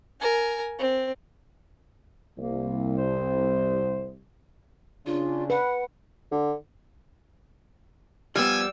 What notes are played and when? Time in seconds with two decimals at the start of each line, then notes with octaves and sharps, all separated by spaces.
0.20 A#4 G#5
0.78 C4
2.38 C2 A#3
2.97 C5
5.06 C#3 D4 F4
5.50 B4 F#5
6.32 D3
8.36 F3 G3 B3 G#5 E6